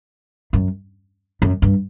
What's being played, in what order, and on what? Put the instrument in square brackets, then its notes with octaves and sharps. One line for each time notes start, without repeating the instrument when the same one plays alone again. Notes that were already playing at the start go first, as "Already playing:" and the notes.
[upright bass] F#2
F#2
G2